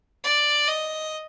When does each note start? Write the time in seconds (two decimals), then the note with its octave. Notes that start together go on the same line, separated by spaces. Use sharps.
0.24 D5
0.67 D#5